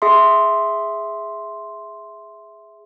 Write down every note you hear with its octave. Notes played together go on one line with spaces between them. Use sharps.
G#4 E5 C6